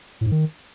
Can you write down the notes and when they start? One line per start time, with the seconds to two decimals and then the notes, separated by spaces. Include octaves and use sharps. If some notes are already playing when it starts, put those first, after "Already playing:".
0.21 A2
0.26 G#2
0.31 D#3